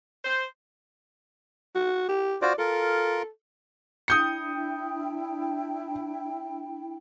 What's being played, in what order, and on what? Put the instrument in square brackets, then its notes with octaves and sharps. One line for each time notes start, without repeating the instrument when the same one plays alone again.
[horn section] C5
[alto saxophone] F#4
G4
[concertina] F4 F#4 C5 [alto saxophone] D5
[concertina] F4 A#4 [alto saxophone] A4
[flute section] D4 E4 G5 [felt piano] D#6 G6 C#7